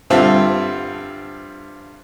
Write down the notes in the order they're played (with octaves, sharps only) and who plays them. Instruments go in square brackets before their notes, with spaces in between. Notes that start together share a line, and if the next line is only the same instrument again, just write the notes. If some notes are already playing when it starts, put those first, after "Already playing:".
[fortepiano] G2 D3 C4 F4 E5